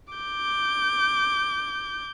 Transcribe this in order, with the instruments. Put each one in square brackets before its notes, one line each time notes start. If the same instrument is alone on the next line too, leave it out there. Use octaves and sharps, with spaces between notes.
[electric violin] D6 G6